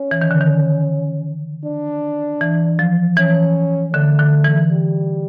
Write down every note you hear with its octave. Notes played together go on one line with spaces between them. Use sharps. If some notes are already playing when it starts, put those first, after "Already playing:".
Already playing: C#4
E3
D#3
D3
D#3
D4
E3
F3
E3 C#4
D3 A3
D3
E3
G3